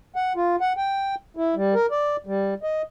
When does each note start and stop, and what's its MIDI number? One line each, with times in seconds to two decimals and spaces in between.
0.16 0.33 78
0.36 0.56 65
0.61 0.73 78
0.77 1.15 79
1.37 1.55 64
1.55 1.74 55
1.75 1.86 70
1.91 2.17 74
2.26 2.54 55
2.63 2.82 75